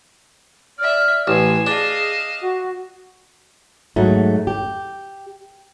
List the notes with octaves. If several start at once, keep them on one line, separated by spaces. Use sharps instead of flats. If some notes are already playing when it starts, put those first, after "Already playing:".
D5 E5 F6
A1 B4 G#5 C6 E7
D4 G#4 D#5 F5
F#4
G#2 F#3 A3
G4